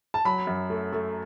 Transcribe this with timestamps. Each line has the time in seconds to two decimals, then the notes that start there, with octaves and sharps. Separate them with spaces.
0.14 A5
0.25 F#3 B5
0.47 F#2
0.70 A3
0.92 A3